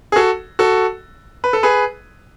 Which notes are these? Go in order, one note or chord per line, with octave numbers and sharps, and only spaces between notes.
G#4
F#4 A4
F#4 A4
B4
A4
G#4 B4